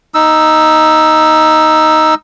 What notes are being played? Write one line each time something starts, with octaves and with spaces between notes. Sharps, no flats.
D#4 E6